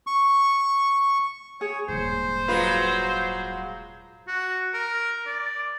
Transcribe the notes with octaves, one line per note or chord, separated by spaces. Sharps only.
C#6
G#4 C#5
D#1 G#2 C5
F#3 G#3 F4 B4
F#4
A#4
D5